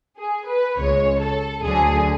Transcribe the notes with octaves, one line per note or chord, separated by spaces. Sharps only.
G#4
B4
C#2 C#3 G#3 C#5
A4
D2 D3 F#3 G#4